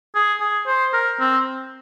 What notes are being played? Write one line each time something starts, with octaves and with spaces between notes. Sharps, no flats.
G#4
G#4
C5
A#4
C4